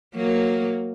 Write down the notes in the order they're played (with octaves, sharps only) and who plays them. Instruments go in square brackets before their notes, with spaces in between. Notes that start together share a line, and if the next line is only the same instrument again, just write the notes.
[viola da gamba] F#3 A#3